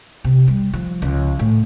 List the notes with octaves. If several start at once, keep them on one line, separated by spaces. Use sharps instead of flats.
C3
G3
F3
C#2
A2